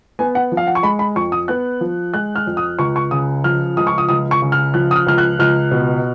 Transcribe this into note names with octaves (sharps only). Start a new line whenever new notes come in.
B3 G#5
F#5
F3
F5
F#5
C#6
G#3 B5
B5
F2 C#6
D#6
B3 F#6
F3
G#3 F#6
F6
F2
D#6
C#2 C#6
C#6
C#3 D#6
F3 F6
C#2 D#6
C#6
D#6
C#2 D#6
C#6
C#3
F6
F3 F#6
D#6
F6
C#2 F6
F#6
C#2 F6
B2